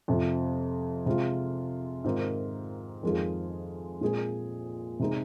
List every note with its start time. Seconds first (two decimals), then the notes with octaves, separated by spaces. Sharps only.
0.08 F2 C3 F3
1.06 C3 G#3 F4
2.04 G#2 D#3 C4 F4 A#4
3.03 F2 D#3 G#3 F4 G#4
4.01 A#2 G#3 C4 G#4
5.00 C3 G#3 D#4 G#4